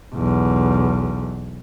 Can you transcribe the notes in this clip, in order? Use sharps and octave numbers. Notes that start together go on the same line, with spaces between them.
B1 E2